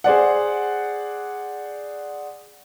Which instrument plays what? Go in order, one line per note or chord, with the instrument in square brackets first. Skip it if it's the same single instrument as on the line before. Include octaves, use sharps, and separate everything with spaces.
[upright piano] G#4 C5 D5 F#5